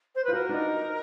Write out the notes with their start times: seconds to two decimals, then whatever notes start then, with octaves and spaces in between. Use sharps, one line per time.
0.15 C5
0.24 F4 B4
0.33 F#4 A#4
0.49 D4
0.54 D#4